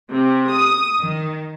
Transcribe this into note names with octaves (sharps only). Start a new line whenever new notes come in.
C3
D#6
D#3